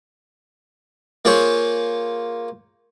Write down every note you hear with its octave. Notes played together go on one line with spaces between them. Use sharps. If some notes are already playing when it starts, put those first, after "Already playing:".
A#3 F4 G#4 C5 C#5